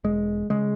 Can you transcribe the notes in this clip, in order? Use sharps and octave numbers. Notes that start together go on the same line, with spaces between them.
E1 G#3
C#3 G#3